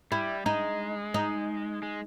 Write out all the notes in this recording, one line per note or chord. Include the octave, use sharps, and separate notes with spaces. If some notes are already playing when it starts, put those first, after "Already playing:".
G3 E4
G#3 D#4
D#4
G#3